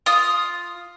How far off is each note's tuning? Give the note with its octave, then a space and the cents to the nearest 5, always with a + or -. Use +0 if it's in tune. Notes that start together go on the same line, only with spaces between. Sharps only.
F4 +0 D#6 +5